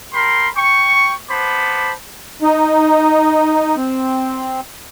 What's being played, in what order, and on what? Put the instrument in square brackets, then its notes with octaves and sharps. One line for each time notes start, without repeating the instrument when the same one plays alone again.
[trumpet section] G4 A#4 B5 C6
G5 C#6
B3 C5 A5 B5 D6
[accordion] D#4
C4